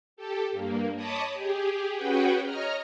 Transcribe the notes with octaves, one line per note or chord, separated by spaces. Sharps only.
G4 A4
G2 A#3
C#5 D#5 A5 B5 D6 D#6
G4 G#4
C#4 F#4 G#4 B4 F#5 G5
C#5 D#5 A#5 F6